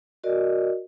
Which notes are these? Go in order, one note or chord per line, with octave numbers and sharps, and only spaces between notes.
F#4 A#4 D5 D#5